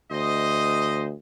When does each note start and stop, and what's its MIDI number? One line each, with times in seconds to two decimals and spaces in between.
0.11 1.13 38
0.11 1.05 72
0.11 1.05 75